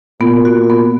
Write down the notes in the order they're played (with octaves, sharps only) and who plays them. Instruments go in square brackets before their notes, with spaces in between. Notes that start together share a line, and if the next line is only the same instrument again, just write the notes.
[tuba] A#2 [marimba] B3
[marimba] F#4
B3